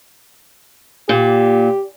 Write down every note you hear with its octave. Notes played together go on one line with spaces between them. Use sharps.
A#2 G4